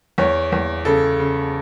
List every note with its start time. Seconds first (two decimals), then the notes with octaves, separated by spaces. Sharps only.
0.18 E2 C#5
0.52 E2
0.85 C#3 A4
1.20 C#3